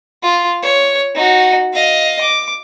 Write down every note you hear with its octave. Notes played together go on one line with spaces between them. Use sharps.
F4
C#5
D#4 F#4
D#5 F5
D6